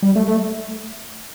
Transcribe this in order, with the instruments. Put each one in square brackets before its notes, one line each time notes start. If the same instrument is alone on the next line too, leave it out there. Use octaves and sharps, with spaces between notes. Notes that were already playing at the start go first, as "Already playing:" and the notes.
[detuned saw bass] G3
A3
A3